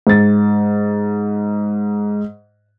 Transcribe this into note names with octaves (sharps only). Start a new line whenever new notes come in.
G#2 A6